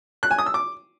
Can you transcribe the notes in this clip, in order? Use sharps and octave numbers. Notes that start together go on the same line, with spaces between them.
F#6
G#5
D#6
E6
D6